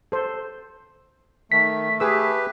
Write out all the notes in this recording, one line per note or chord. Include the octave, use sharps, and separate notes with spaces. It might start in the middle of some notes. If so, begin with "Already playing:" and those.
A4 C5
D#3 A3 B6
G4 G#4 B4 E6